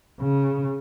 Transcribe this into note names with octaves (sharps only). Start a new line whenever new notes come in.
C#3